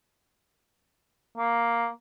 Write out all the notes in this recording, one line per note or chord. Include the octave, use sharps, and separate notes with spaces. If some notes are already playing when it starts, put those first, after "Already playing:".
A#3